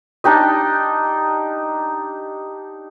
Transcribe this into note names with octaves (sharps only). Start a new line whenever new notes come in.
D4 D#4 G4 D#5